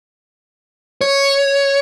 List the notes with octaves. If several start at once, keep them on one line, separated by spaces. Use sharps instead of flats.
C#5